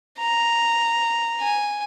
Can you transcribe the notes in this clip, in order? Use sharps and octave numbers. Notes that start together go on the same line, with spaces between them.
A#5
G#5